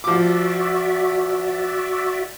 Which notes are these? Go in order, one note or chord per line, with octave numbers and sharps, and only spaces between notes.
F3 F#4 D5 E5 D6